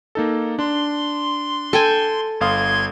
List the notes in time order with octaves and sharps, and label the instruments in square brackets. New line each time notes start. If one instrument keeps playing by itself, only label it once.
[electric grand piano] A#3 D#4 A4
[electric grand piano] D4 [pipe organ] C6
[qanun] A4 G5 G#5
[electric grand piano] G1 F5 D#6 [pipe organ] C6 G#6